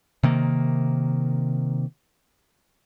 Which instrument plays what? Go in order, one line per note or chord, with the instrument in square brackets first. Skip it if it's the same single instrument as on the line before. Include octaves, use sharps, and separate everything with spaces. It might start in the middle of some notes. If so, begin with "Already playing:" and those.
[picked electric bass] C3 D#3 A#3